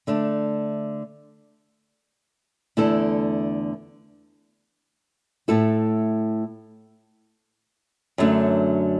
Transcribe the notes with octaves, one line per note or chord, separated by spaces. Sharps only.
D3 A3 D4
E2 D3 A3 E4 A4
A2 A3 E4 A4
F#2 D3 F#3 A3 D4